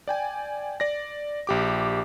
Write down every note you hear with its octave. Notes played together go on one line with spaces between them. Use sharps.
D5 G5 G#5
D5 A#6
A#1 G4 D6